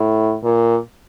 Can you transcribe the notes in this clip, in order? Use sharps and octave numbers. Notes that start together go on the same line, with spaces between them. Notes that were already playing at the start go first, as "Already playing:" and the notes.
Already playing: A2
A#2